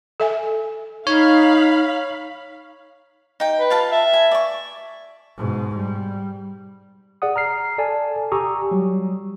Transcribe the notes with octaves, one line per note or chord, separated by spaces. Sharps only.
A4 E5 G#5
D#4 C#5 F5 B5
D#4 G5
B4
F4 F5 A5
E5
G#5
D5 C#6
G#2 B2
G3
G#4 D5 F#5 D#6
A#5 F6 C7
A4 D5 G#5 A5
G4 G#5 A#5 C#6 D#6 E6
F#3 G3